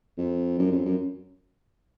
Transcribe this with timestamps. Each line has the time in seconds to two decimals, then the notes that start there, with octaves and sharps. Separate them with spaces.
0.18 F2
0.59 F#2
0.72 F2
0.85 F#2